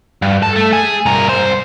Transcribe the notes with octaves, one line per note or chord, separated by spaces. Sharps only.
G2
A4
A3
G#4
G2 A#4
C2 C5